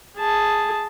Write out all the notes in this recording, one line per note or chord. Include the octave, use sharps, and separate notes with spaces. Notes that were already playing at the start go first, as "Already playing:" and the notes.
G#4 A5